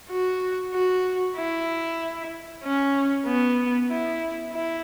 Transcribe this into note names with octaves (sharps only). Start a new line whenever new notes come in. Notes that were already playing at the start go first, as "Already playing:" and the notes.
F#4
F#4
E4
C#4
B3
E4
E4